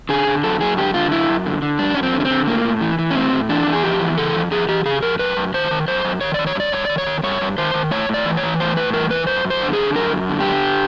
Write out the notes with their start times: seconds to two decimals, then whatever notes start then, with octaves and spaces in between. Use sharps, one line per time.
0.09 D3 G#4
0.27 D3
0.44 F#2 A4
0.61 F#2 G#4
0.77 D3 G4
0.94 D3 F4
1.11 F#2 E4
1.28 F#2
1.46 D3
1.62 D3
1.79 F#2 D4
1.95 F#2 C#4
2.03 C4
2.14 D3
2.20 C#4
2.25 C4
2.31 D3
2.47 A2 A#3
2.64 A2
2.81 E3
2.99 E3
3.10 C#4
3.15 A2 C4
3.32 A2
3.49 E3 D4
3.67 E3
3.73 G#4
3.83 F2 G4
4.00 E3
4.17 C#3 A4
4.35 F2
4.51 F2 G#4
4.68 E3 G4
4.85 C#3 G#4
5.02 F2 A#4
5.19 F#2 B4
5.37 F#2
5.54 D#3 C5
5.71 D#3
5.88 F#2 C5
6.05 F#2
6.21 D#3 C#5
6.34 D#3 D5
6.47 C#5
6.55 G2 D5
6.72 G2 C#5
6.85 D#3 D5
6.98 C#5
7.06 D#3
7.23 G2 C#5
7.41 G2
7.58 D#3 C5
7.74 D#3
7.91 A2 C#5
8.09 A2 D5
8.25 E3
8.37 C#5
8.43 E3
8.60 A2 C5
8.76 A2 B4
8.94 E3 A#4
9.10 E3 B4
9.27 F#2 C5
9.45 F#2
9.50 C5
9.61 D3
9.73 G#4
9.79 D3
9.95 F#2 A#4
10.13 F#2
10.30 D3
10.40 G4
10.46 D3